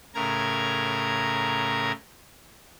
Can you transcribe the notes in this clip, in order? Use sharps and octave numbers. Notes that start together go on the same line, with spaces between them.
A2 C#3 A#4 A#5 G#6